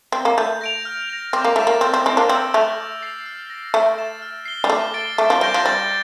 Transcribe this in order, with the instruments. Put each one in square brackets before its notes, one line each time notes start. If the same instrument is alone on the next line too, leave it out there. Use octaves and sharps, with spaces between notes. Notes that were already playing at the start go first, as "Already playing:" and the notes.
[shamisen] C4
A#3
[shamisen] A3 [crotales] G6
[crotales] A#6 D7 F7
F6
A#6 F7
[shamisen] C4 [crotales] D6
[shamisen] A#3
[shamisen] A3 [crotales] A6 E7
[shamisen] A#3
[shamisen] C4 [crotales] G6
[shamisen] C4
[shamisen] C4 E4 [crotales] D7 G7
[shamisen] A#3 D4
[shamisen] C4 [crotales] E6
[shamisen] A3 [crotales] G6 A#6 F7
[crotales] D6
A6 C7 F7
F6
A#6 D7
[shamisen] A3 [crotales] E6
[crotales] A6 E7
F6
C7 G7
[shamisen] G3
[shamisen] A3 [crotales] D6
[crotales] A6 D7 G7
[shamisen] A3 [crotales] D6
[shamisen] F3
[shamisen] G3 [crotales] G6 A#6 D7 G7
[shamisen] F3
[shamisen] G3 [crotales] A6